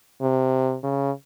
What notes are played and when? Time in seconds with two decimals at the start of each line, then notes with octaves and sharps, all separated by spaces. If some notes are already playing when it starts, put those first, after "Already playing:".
0.21 C3
0.83 C#3